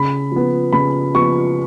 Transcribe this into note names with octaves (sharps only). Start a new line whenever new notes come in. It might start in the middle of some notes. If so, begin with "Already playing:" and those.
Already playing: C#3 B5
F3 B3
C#3 B5
F3 B3 C#6